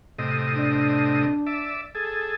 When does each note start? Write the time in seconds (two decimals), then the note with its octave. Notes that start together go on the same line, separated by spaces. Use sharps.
0.19 A2 C3 D#5
0.54 D4
1.46 D5 E5
1.95 G#4 A4